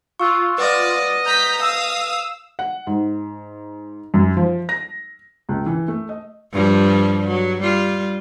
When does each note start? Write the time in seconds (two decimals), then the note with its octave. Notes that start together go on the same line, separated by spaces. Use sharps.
0.20 F4 C#6 E6 F#6
0.58 B4 D5 D#5 F#5
1.26 A#5 G6 B6
1.61 F5 D#6 E6
2.59 F#5
2.87 G#2
4.14 F#2
4.37 F3
4.69 A#6
5.49 C#2
5.66 E3
5.88 A3
6.09 D#5
6.52 G2 F3 G3
7.27 F#3
7.61 G3 F4